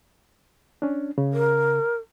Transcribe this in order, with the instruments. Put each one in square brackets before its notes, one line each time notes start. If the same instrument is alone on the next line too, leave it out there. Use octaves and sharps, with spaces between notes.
[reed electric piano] C#4 D4
C#3
[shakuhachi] A#4